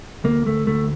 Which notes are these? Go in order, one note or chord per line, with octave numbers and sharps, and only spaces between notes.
D2 A#3
D2 A3
D2 A3